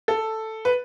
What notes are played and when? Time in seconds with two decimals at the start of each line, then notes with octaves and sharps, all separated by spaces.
0.08 A4
0.65 B4